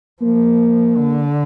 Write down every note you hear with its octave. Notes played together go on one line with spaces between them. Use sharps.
F3 A#3
D3